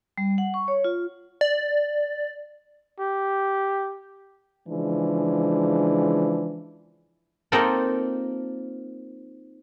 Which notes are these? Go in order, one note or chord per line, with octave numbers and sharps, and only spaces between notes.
G3
F#5
C#6
C#5
F4
D5
G4
C#3 E3 F3 G#3 D4
A#3 C4 D#4 F4 A4 A#4